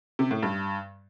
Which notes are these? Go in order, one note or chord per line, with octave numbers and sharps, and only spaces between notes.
C3
A2
G2